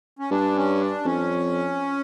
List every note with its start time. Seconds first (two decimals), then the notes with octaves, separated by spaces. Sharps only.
0.19 C#4
0.31 G2 D4
0.56 C#4
0.80 D4
1.05 F2 C#4